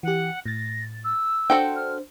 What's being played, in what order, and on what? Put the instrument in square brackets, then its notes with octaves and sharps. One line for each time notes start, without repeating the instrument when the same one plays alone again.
[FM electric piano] E3 G4 [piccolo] F#5
[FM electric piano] A2 A6 [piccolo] A#6
[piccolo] E6
[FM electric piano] D4 C5 [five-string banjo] F#4 A4 G5
[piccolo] F6